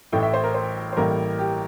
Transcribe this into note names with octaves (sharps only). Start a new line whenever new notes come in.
A1 A2 E3 A3 G5
E5
C5
A#4
C5
C5
A1 A2 G3 A#3 A#4
G4